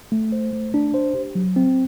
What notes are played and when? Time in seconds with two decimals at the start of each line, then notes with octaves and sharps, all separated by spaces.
0.12 A3
0.32 C5
0.53 A3
0.74 D4
0.94 C5
1.15 G4
1.35 F#3
1.56 C4